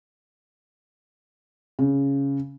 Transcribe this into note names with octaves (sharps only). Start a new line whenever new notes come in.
C#3